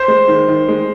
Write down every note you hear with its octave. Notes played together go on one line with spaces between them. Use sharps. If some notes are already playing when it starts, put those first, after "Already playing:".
Already playing: C5
G#3
D#3
D#3
G#3